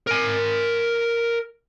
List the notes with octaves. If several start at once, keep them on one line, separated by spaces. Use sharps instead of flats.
A#4 G#5